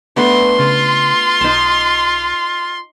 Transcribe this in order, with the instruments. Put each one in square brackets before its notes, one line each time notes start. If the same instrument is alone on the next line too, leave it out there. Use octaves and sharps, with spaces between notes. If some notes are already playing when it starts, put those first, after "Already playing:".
[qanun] A3 B3 D4 [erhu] C6
[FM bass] C#3 [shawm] F4
[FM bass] B1 [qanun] D#4 A5